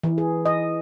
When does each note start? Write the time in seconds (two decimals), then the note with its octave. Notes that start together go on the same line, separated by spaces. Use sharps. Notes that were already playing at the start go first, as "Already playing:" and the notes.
0.03 E3
0.18 G#4
0.45 D#5